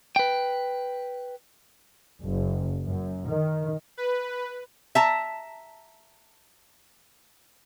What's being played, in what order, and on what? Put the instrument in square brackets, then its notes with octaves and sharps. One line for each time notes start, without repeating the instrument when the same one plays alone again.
[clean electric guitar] B4 G5
[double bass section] F#1
F#2
D#3
[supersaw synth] B4
[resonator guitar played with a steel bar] E5 A5 A#5